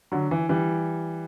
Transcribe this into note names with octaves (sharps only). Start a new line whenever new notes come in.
D3 F#3
E3
E3 G3